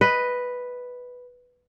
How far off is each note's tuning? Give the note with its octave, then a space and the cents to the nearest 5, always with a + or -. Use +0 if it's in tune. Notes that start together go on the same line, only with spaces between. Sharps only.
B4 +0 D#5 +0